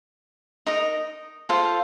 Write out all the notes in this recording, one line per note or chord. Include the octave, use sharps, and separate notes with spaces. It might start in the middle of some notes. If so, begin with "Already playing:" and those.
D#4 A#4 D#5
F4 A4 C5 F5